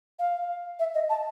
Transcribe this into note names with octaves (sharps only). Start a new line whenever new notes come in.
F5
E5
D#5
A5